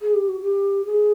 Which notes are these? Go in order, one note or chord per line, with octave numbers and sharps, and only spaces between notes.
G#4
G4
F#4
G4
G#4